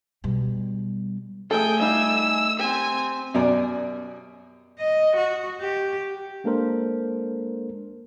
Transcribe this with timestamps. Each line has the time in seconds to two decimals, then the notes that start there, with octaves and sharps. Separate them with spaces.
0.24 B2 G3
1.51 A3 G#4 A4 G5 G#5
1.80 G3 D#4 F4 E6
2.59 C4 G4 G#5
3.34 F#2 B2 G4 A#4 D5
4.79 D#5
5.16 F#4
5.61 G4
6.44 G#3 A#3 D4 A4 A#4 C5